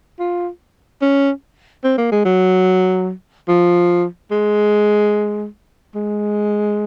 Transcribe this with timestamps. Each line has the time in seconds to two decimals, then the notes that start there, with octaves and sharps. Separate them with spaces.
0.20 F4
1.02 C#4
1.84 C4
1.98 A#3
2.12 G#3
2.25 F#3
3.48 F3
4.31 G#3
5.95 G#3